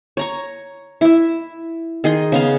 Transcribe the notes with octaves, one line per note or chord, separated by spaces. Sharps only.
C#5 A#5 C#6
E4 E5
D#3 G#4 D#5 C6
C#3 B3 F5